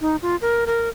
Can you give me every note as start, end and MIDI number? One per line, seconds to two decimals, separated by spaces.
0.01 0.16 63
0.22 0.36 65
0.42 0.64 70
0.66 0.89 70